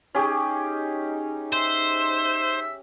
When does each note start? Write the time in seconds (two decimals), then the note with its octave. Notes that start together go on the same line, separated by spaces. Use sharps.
0.15 C#4 D#4 G4 G#4
1.52 C5 E5